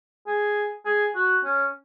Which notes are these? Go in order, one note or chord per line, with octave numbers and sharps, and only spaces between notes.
G#4
G#4
F#4
C#4